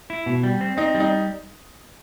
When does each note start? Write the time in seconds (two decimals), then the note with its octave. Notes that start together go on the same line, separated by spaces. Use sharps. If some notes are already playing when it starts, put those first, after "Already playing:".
0.10 E4
0.26 B2
0.43 G3
0.61 C4
0.77 C4 D#4
0.95 G3
1.00 D#4